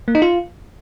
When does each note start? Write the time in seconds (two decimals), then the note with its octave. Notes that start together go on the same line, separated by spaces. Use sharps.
0.08 A#3
0.15 D#4
0.22 F4